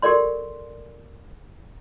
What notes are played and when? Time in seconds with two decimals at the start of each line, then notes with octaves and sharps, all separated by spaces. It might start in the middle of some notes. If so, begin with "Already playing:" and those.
0.02 G4 A4 A#4 D5 C6